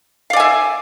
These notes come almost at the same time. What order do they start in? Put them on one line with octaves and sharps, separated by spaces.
F5 D5 G#5 E5